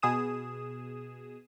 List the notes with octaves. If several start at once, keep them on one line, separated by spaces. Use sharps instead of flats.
B2 G#4 D#6 E7